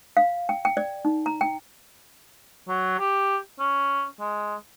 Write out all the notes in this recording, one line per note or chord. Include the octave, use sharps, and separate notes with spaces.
F5
G5
G5
D5
D#4
A#5
G5
F#3
G4
C#4
G#3